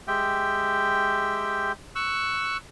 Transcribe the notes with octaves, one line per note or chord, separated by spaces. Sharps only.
G#3 G4 E5 G5
C#6 E6 F#6